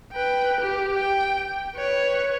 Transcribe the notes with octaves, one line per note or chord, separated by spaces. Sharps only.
B4 G5
G4
G5
B4 C#5